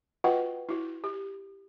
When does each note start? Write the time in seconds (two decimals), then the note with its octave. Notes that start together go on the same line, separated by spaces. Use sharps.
0.24 F4 F#4 B4 D#5 F#5 G5
0.69 E4 F#4
1.04 G4